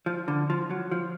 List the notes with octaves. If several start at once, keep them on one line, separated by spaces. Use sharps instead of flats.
F3
D3
F3
F#3
F3